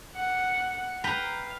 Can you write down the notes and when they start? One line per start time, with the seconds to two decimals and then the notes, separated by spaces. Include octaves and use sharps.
0.16 F#5
1.04 B4 F5 G5 A#5